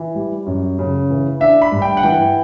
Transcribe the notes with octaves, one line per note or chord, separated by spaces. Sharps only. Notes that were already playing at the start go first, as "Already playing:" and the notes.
Already playing: E3
G3
F#2
C#3
E3
D4 E5
B5
G2
G5
F#5
E3 G5